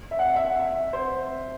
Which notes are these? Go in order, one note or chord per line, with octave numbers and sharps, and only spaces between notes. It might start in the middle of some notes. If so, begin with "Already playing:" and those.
E5
F#5
E5
F#5
E5
C5